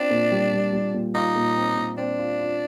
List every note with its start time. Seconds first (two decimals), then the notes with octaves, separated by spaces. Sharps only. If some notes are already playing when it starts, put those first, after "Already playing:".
Already playing: C4 D4 F4
0.11 A#2
0.31 G3
0.53 G3
0.73 G3
0.94 A#2
1.15 D#4 F4
1.36 A#2
1.56 C4
1.77 A#2
1.97 C4 D4
2.19 F4
2.40 F4